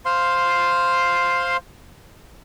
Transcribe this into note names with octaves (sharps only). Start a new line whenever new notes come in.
C5 F5 C6